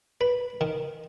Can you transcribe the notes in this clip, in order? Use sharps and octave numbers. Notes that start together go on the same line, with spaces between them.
B4
D#3